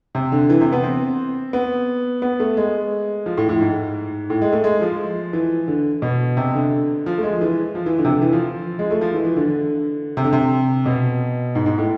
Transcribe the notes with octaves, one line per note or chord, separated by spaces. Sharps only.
C3
D3
E3
C3
B3
C4
B3
B3
A3
G#3
F3
A2
A2
G#2
A2
G#3
A3
G#3
F3
E3
D3
B2
C3
D3
F3
A3
G#3
E3
F3
E3
D3
C3
D3
E3
F3
G#3
A3
F3
E3
E3
D3
D3
C3
D3
C3
B2
G#2
G#2
A2